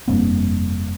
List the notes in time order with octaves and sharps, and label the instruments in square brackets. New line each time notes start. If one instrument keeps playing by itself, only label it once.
[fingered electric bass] F1 G2 A#3 C4